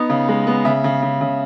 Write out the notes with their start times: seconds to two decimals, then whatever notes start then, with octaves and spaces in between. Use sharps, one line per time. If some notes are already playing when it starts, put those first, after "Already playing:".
Already playing: B3 D#4
0.10 C#3
0.29 G#3
0.47 B3
0.65 C#3 E5
0.84 C#3
1.02 C#3
1.21 C#3